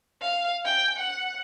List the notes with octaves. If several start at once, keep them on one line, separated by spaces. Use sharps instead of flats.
F5
G5
F#5